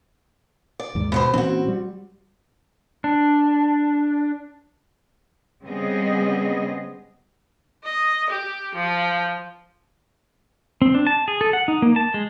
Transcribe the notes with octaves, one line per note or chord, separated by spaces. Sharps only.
D5
D#2 G#2
B2 G3 C5
A#2 E3 C4 C#4 F#4
G3
D4
C#3 G3 B3 C4 G#4 D#5
D#5
G4
F3
C4
D4
A5
G#4
A4
F#5
D#4
A#3
A5
G#3